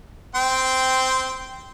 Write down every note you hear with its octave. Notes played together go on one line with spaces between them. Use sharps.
C4 G5 C6